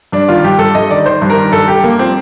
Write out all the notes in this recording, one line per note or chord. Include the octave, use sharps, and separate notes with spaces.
G2 D4
D#3 F4
G2 G4
G2 A4
G2 D#5
D#3 D5
D#3 C5
G2
A#4
D#3
G2 A4
G2 G4
G2 A#3
F3 C4